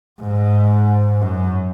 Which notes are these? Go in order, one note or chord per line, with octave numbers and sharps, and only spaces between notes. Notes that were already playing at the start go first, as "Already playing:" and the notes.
G#2
F#2